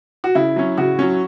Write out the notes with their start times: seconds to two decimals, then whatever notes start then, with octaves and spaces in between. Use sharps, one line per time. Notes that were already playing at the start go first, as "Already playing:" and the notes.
0.24 F#4
0.35 C#3 E4
0.56 F#3 C#4
0.78 C#3 F#4
0.99 F#3 C#4